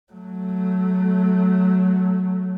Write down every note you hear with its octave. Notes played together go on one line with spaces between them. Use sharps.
F#3 A3